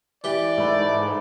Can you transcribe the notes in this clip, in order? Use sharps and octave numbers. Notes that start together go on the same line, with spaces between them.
E3 G4 D5
G#2 A3 B4